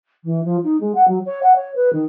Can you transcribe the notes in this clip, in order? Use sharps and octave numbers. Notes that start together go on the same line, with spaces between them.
E3
F3
D#4
G#3
F#5
F#3
C#5
F#5
C#5
B4
D#3